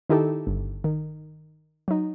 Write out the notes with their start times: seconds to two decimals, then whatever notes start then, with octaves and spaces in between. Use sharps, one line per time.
0.10 D#3 D#4 E4 G4 A4
0.47 G1
0.84 D#3
1.88 F#3 D#4